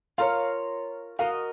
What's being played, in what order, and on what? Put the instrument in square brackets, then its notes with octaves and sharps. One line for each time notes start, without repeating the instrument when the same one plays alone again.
[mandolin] F4 A#4 C#5 [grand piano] F5
[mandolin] F#4 A#4 D#5 [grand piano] F5